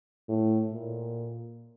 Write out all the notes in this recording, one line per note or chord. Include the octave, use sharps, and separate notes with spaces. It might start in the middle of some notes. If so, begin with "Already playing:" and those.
A2
A#2